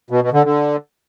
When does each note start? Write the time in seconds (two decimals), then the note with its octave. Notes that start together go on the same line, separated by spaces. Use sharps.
0.11 B2
0.22 B2
0.33 D3
0.44 D3